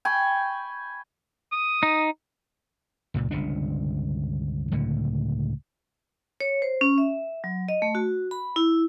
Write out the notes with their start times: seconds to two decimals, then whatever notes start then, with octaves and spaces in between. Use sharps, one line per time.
0.05 G5 G#5 B5 C#6
1.52 D#6
1.83 D#4
3.14 C#2 A#2
3.31 G1 C#2 C3 D4
4.72 C#2 A2 D3
6.41 C#5
6.62 C5
6.81 C#4
6.98 E5
7.44 F#3
7.69 D#5
7.82 A3
7.95 F#4
8.31 B5
8.56 E4